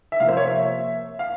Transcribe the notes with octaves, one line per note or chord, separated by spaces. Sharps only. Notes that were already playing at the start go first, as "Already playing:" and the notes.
E5
C3 F3 A#3 F5
C5
C#5
E5
F5